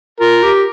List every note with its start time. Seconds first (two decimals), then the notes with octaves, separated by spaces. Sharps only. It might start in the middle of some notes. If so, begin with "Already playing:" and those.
0.20 F4 A#4
0.43 G4